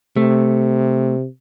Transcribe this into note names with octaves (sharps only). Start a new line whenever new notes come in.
C3 A3